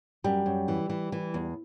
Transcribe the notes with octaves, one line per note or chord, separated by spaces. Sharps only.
F#2 G3
F#2
E3
E3
E3
E2